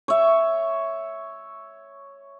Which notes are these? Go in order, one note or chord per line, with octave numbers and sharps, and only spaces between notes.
C#5 E5